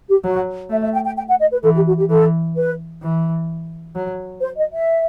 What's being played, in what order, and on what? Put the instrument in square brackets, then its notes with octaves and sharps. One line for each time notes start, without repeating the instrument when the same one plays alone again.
[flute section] G4
[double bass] F#3 [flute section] F#4
[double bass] A3 [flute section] E5
[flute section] E5
G5
G5
G5
F#5
D#5
B4
[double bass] E3 [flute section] A4
[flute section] G4
F#4
G4
[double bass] E3 [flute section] A4
[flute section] B4
[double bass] E3
F#3
[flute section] C5
D#5
E5